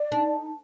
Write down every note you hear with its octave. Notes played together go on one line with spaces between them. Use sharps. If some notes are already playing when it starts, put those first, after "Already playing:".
Already playing: D5
D4 D#4